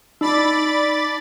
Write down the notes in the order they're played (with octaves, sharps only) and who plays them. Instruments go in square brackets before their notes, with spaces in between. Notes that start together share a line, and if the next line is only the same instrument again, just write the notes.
[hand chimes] D#4 [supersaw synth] D5 B5 A6